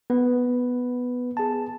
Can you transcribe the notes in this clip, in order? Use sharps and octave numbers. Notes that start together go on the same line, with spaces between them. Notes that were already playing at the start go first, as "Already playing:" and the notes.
B3 B4
G#4 A5